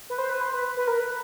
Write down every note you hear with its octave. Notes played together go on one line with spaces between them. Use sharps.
B4
C5
B4
C5
B4
B4
A#4
B4